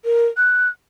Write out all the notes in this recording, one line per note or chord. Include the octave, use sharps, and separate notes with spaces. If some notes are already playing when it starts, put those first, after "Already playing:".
A#4
F#6